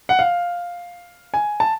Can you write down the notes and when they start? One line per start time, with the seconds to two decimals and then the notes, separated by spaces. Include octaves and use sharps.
0.09 F#5
0.19 F5
1.34 G#5
1.60 A5